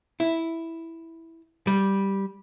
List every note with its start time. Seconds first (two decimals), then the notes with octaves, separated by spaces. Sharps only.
0.20 E4
1.67 G3